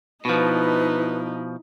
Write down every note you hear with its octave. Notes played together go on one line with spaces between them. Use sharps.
B2 F3 D#4 E4 B4